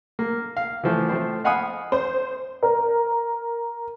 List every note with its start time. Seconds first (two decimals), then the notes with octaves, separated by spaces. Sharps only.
0.19 A#3
0.57 F5
0.84 E3 F3 A3
1.09 F3 A3 C4 C5
1.44 D#5 F5 F#5 G#5 B5 D#6
1.92 C5
2.63 A#4